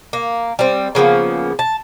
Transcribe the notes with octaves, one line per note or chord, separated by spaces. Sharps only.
A#3
G3 C4
C#3 F3 A#3 B3
A5